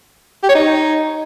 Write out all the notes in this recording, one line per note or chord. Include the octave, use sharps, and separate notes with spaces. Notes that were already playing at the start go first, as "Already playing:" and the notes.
G4
C#5
D#4